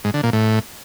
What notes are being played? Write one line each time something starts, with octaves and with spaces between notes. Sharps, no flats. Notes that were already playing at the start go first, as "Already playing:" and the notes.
G#2
D3
A#2
A2